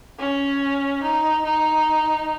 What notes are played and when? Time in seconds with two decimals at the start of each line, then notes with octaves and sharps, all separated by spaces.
0.19 C#4
1.03 D#4
1.45 D#4